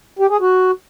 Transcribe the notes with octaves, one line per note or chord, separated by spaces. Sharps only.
G4
G#4
F#4